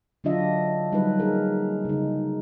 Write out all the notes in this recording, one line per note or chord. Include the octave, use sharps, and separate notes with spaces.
D3 F#3 D4 F4 D#5 E5
F#3 G3 D#4 F#4 B4
A#3 D#4 G#4 A#4
C#3 D#4